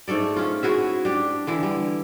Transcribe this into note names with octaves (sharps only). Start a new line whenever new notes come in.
G#2 A3 A4 D5
C#4 F4
E4 F#4 G#4 E5
D4 G4
D3 E3 E4
G3